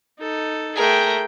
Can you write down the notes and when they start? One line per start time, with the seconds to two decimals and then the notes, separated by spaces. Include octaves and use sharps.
0.19 D#4 A4
0.76 A3 G#4 A#4 G5